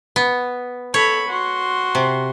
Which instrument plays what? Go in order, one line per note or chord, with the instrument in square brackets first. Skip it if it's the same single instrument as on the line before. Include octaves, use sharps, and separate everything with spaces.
[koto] B3
[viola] A4 B5 [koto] C#5
[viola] F#4 C6
[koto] C3